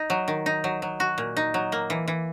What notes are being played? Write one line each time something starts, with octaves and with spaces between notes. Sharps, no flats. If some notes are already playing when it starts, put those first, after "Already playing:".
Already playing: D#4
F#3
D#3
D#4
F#3
F#3
F#4
A#2
D#4
F#3
A#3
E3
E3